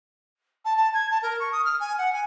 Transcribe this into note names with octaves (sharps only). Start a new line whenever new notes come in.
A5
A5
G#6
A5
A#4
C#6
D#6
F6
G#5
F#5
G#5